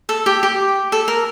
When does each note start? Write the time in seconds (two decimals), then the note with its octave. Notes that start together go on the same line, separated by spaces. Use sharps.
0.09 A4
0.26 G4
0.43 G4
0.92 A4
1.08 A#4